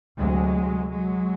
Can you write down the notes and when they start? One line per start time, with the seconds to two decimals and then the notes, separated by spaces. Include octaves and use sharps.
0.17 D2 C3 F#3 G#3
0.91 F#3 G#3